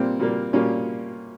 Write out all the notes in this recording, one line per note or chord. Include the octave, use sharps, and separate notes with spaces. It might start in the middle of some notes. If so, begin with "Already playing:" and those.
Already playing: A#2 G3 A#3 C4
A#2 G3 A#3
A#2 G3 A#3 C#4